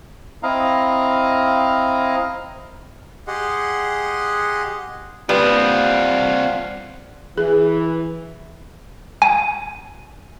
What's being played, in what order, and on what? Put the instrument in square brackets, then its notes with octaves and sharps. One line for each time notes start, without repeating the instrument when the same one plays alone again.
[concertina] C4 E4 D#5 F5 A#5
[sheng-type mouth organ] G4 G#4 D#5 F#5 C6
[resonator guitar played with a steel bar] G3 [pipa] B3 [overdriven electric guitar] C4 D4 [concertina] F4 F5 F#5
[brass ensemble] E3 [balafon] G#4
[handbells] G#5